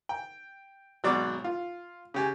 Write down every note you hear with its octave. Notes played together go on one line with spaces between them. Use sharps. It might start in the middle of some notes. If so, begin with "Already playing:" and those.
G5
G#1 B2 F#3 D5 D6
F4
C#3 G4 G#5